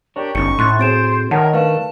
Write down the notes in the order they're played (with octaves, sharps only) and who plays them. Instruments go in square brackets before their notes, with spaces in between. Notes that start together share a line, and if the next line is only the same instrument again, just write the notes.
[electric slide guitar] D4 A#4 C#5 [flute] G4
[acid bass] G1 [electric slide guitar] C#4 D#4 A4 [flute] C#6 [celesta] C#7
[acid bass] A2 [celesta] C6 F#6 A6
[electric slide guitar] C4 F#4 G#4 [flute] C5 [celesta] A6 D7 E7
[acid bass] D#3 [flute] A#4 [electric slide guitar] C#5 E5 [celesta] F#5 A5
[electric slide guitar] A3 D4 [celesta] B4 F5 [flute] A5